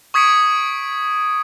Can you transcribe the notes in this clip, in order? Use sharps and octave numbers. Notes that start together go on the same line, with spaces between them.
C#6 D#6 G#6 B6 C#7 D7